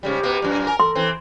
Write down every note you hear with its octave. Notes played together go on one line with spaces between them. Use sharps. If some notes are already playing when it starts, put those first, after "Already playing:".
G#2 C#3 G3 G4
B2 A#3 B3
F#2 A#2
A#4 G#5
A4 C6
E3 C4